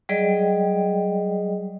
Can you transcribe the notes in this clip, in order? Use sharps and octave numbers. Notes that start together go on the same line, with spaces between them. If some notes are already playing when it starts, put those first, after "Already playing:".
F#3 G3 G#4 D5 D#5 G5